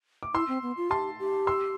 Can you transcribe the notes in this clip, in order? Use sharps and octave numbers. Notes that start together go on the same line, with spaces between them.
D6
E4 C6 E6
C4
B3
F4
G4 A5 C6
G4
C6 E6